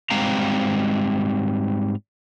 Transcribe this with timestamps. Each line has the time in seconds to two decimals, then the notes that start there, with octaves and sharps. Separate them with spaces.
0.10 G#2 G3 G#3 C4 F5 A#5